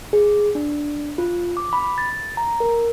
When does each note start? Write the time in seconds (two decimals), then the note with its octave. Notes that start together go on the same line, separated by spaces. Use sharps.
0.13 G#4
0.55 D4
1.18 F4
1.57 D6
1.73 B5
1.98 A6
2.37 A#5
2.60 A#4